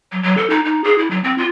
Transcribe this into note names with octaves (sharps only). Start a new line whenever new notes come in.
F#3
F#3
A4
D#4
D#4
G#4
E4
F#3
C4
F4